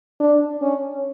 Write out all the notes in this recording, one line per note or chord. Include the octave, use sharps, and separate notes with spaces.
D4
C#4